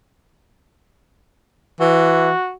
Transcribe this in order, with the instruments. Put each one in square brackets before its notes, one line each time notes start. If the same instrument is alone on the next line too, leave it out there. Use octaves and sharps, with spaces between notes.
[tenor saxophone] E3 [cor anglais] F#4